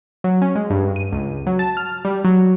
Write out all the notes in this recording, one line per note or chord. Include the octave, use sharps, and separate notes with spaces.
F#3
C#4
G#3
G2
D#7
C#2
F#3
A5
F6
G3
F#3